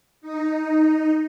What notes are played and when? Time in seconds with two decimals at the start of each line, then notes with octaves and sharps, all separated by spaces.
0.21 D#4